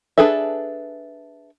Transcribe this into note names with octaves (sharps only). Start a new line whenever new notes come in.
D4 G#4 A4 B4 E5